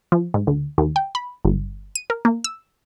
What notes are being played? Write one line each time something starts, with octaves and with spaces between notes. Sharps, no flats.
F3
G#2
D2
D#2
G5
B5
G1
D#7
A#4
A#3
E6